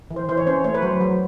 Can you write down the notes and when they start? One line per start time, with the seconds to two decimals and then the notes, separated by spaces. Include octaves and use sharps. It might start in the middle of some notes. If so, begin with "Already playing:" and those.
0.11 E3
0.16 C5
0.29 E3 C5
0.37 C#5
0.47 C#4 C5
0.64 A3 C#5
0.75 B4
0.82 F#3 C5
1.01 F#3